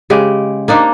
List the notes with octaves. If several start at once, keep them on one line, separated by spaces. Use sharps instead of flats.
C#3 G#3 G4
A#3 D4 D#4 C5